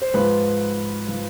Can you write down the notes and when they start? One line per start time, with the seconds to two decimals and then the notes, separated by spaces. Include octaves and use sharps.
0.02 C5
0.14 G#2 F3 B4
1.08 F3